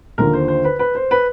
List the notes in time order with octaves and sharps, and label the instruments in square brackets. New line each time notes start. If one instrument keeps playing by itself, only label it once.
[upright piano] D#2 D3 F3 A#4
C5
C5
B4
B4
C5
B4